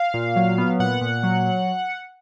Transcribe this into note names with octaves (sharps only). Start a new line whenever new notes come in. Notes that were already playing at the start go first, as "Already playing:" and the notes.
Already playing: F5
A#2
F#3
B3
A#2 F#5
A#2
F#3